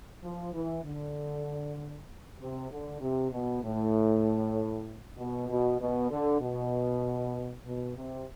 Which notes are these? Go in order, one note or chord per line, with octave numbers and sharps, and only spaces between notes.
F3
E3
D3
C3
D3
C3
B2
A2
B2
B2
B2
D3
B2
B2
C3